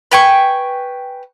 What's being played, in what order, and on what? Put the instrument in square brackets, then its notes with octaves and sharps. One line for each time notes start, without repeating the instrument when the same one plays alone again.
[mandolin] B4 G5 G#5 C#6